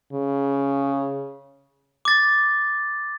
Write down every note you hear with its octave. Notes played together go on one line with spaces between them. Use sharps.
C#3
D6 A6